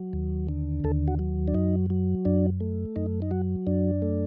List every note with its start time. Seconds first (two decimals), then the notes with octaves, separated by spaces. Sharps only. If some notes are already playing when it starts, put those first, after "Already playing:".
Already playing: F#3
0.13 D#2
0.49 D3
0.84 D#2 A4
1.08 F#4
1.19 F#3
1.48 D4
1.54 F#2 D#4
1.90 F#3
2.25 F#2 D4
2.60 A3
2.96 F#2 D#4
3.22 D#4
3.31 F#3 F#4
3.67 F#2 D4
4.02 A3